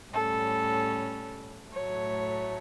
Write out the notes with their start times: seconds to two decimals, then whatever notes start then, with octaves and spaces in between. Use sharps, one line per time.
0.12 A2 G3 C#4 A4
1.72 A2 F#3 A3 C#5